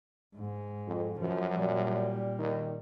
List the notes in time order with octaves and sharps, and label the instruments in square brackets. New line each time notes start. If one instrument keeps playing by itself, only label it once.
[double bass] G#2
[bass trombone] F2
[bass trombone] F#2 [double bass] F3
[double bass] A#2 G3
[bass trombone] D#3